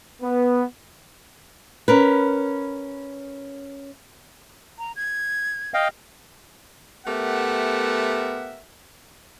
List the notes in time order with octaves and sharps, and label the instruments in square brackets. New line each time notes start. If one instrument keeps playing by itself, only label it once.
[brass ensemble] B3
[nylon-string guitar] C#4 A#4 B4
[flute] A#5
G#6
[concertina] D#5 F5 G5
[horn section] A3 B3 G4 A#4 E5 F#5